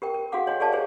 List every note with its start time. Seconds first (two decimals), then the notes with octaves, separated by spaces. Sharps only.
0.02 G4 A#4 G5
0.15 A#4
0.32 F#4 G#4 A4 F5 F#5 D6
0.47 C#5 D#5 G#5
0.60 G4 G#4 A#4 D5 F5 A5
0.72 G4 G#4 A#4 C5 C#5 G#5